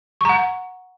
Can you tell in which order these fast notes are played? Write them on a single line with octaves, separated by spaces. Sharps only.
C#6 A#5 F#5